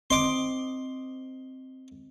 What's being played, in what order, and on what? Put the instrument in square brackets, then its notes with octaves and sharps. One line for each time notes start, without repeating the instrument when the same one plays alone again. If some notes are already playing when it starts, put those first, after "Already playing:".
[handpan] C4 D#5 [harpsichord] C6 D6